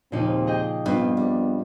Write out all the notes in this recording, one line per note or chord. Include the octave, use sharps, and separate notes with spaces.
D#2 A#2 C#3 F3 C4 D#4
G#4 D#5 G5
G2 B3 C4 F4
G3